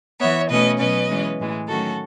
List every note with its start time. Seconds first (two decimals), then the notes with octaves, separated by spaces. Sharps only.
0.19 E3 B3 C#5 E5
0.49 B2 A3 C#4 B4 D#5
0.79 B2 F#3 C#4 B4 D#5
1.09 E3 G#3 C#4
1.39 A2 E3 G#3
1.68 D#3 F#3 A3 C#4 F#4 A4